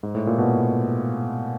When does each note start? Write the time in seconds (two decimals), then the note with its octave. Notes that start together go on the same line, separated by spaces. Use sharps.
0.03 G#2
0.15 A2
0.27 A#2
0.38 B2